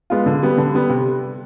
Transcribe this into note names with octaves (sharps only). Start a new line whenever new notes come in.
G#3 B3 F4
D3
G3 B3
D3
G3 B3
C3